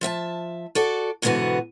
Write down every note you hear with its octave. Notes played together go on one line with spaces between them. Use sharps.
F3 E5 G5 A5
F#4 A4 D5
G#2 B2 D3 E3 B3 F#4